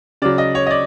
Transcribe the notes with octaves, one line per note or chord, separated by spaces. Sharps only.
C#3 F#3 D5
D#5
C#5
D#5
D5